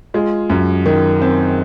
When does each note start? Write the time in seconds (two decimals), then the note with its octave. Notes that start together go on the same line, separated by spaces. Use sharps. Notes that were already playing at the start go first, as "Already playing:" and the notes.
0.14 G#3 F4
0.50 F#2
0.86 D#3
1.22 C4